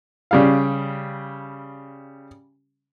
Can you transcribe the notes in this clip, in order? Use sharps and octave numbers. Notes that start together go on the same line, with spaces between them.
C#3 G3 F5